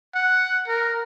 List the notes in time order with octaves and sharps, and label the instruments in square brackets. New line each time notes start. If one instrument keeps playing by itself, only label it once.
[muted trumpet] F#5
A#4